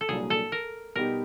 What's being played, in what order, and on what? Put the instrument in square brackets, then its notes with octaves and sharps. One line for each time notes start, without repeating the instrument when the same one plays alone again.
[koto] A4
[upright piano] C2 A#2 F#3 A#3 D4 [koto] G#4
[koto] A4
A#4
[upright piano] B2 G3 B3 D#4 G4 [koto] A#4